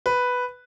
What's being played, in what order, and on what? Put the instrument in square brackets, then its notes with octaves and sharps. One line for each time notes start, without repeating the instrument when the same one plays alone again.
[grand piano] B4